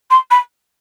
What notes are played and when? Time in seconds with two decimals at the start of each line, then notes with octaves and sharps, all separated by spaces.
0.10 C6
0.31 B5